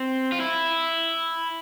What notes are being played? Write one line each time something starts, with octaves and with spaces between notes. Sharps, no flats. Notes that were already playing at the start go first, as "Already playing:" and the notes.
Already playing: C4
F4
E4